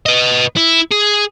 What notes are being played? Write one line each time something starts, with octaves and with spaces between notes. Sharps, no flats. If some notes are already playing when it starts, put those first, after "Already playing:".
B4 D#5
E4
G#4